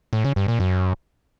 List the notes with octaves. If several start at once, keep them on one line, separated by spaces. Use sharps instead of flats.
A2
C#3
G2
A#2
F#2